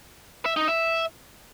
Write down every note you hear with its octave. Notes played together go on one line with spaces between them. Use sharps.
E5
D#4
E5